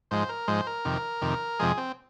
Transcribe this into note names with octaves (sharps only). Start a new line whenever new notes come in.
G#2 F3 G#3 C5
A#4
G#2 F3 G#3 C5
A#4
F2 C3 D#3
F2 C3 D#3
F2 C3 F3 G#3 G#4
C4